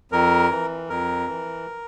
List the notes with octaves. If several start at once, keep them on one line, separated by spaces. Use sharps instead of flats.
F2 A#4
E3
F2 A#4
E3